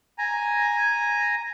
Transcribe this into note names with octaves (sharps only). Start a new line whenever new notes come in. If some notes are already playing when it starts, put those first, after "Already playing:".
G#5 A#5